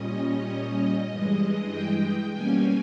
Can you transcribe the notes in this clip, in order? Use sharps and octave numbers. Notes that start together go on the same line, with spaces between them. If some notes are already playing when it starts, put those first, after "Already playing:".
Already playing: A#2 G3 C#4 D#5
G2 E3 G#3
G5
B2 G3 A#3 C#4 G#5